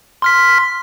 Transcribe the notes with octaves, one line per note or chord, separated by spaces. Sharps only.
C6 F6 B6